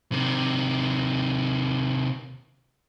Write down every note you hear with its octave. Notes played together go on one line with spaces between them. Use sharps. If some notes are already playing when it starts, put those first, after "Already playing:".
C3 D#3